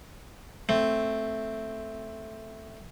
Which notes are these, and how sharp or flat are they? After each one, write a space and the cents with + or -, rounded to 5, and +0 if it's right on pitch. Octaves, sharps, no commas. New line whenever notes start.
A3 +0 C4 +0